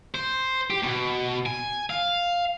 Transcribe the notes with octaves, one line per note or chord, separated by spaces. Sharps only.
C5
G4
B2
G#5
F5